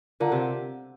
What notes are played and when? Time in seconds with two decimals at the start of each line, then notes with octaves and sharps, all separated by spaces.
0.20 D3 F4 A#4 D5 F5 A#5
0.32 C3